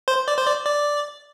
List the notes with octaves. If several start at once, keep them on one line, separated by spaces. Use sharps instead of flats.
C5
D5
C5
D5
D5